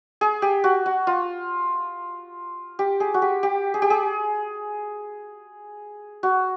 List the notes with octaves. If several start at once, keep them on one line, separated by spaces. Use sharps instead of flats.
G#4
G4
F#4
F#4
F4
G4
G#4
F#4
G4
G4
G#4
G4
G#4
F#4